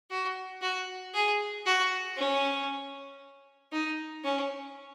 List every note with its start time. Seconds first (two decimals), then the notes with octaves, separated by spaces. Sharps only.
0.10 F#4
0.62 F#4
1.14 G#4
1.66 F#4
2.17 C#4
3.73 D#4
4.24 C#4